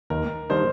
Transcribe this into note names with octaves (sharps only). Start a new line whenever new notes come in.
D#2 A#4
D#3 G3 A#3 D4 C5